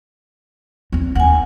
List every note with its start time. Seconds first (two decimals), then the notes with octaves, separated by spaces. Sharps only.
0.92 E2 C4
1.15 D#2 F#5 G#5